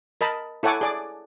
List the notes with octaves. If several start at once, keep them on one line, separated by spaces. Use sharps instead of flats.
A#4 D#5 A5 B5
E4 A4 C#5 F#5 G#5 D6
G#4 D5 D6